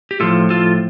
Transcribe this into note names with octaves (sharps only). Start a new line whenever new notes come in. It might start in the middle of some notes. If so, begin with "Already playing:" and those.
G4
A2 F3 F4 A4
F4 A4